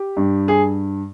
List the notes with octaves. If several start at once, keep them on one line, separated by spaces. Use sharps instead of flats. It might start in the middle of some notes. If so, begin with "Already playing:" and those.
Already playing: G4
G2
G#4